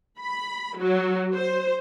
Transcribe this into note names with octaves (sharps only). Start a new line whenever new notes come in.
B5
F#3
C5